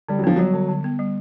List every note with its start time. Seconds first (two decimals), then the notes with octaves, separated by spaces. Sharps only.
0.09 D3 G3
0.19 F#3
0.24 F3 B3
0.36 F#3 G3
0.53 D3
0.69 D3
0.84 B3
0.99 G3